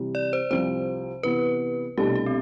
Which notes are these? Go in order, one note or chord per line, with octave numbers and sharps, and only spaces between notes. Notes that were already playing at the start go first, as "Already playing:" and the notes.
Already playing: C3 E3 G3
D5
C5
C2 C3 F3 C4 C5
C3 E3 B3 E4 B4
C2 B2 A3 D4 G4
G4
C4